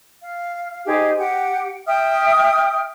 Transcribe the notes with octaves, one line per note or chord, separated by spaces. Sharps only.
F5
D#4 G4 G#4 C5
G4 F#5 G5
E5 G5 D#6 F6